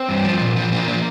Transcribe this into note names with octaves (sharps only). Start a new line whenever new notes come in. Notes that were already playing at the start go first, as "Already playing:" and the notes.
Already playing: C4
G2
F3
A#2
F3
F3 A#3
F3